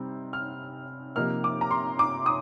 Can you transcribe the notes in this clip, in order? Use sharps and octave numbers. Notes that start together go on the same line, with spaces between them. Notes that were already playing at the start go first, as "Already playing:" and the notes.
Already playing: C3 G3 C4 D#4
F6
C3 F3 A#3 D#4 F6
D6
A#5
C6
D6
D#6